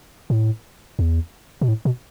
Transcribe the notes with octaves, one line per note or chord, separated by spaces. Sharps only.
A2
E2
B2
A2
B2